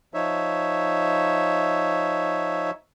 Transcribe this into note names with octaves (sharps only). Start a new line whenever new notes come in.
F3 D#4 C#5 E5